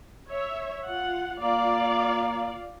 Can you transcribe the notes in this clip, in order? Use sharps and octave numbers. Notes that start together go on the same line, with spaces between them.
C#5 E5
F4 F#5
A#3 F4 D5 F5